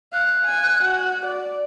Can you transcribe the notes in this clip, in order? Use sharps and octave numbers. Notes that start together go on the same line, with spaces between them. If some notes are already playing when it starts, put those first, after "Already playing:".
F5 F#6
G#5
F#4
D5